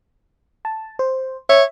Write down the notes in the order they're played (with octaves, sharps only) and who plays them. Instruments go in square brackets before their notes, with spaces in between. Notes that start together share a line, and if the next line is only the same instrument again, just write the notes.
[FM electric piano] A5
C5
[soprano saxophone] C#5 [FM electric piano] E5